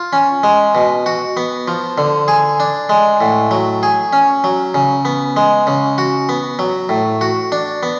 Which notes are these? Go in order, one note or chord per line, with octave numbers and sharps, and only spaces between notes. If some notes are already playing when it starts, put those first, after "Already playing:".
Already playing: F4
C#4
G#3
B2
F#4
B3
F3
D3
G#4
D4
G#3
A2
F#3
G#4
C#4
F#3
C#3
B3
G#3
C#3
F#4
B3
F#3
A2
F#4
D4
B3